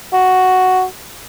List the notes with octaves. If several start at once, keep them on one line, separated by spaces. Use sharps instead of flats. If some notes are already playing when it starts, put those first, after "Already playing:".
F#4